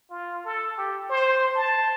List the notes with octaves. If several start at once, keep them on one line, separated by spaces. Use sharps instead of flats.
F4
A4
G4
C5
A5